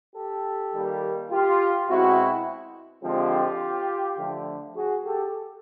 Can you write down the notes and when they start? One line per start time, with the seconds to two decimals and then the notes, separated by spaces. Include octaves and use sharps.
0.15 G4 A4
0.73 D#3 G3 A#3
1.31 F4 G4
1.87 B2 G#3 C4 E4 F#4
3.03 D3 F3 G#3 C4 F4 G4
4.18 D3 F3 A3
4.75 F#4 G#4
5.04 G4 A4